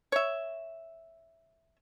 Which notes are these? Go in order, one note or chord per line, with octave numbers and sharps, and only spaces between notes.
C#5 E5